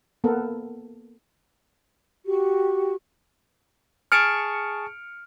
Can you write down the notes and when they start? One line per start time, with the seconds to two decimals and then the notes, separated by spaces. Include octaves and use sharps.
0.24 A#3 B3 A4 A#4
2.26 F#4 G4
4.12 G#4 A5 C#6 F6 C#7 D7